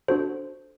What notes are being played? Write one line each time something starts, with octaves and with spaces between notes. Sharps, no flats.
D4 F#4 A4 C5